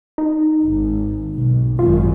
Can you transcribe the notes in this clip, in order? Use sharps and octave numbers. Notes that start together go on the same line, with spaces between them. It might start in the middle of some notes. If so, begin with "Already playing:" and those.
D#4
G#1
B1
G#1 F#2 D#3 F4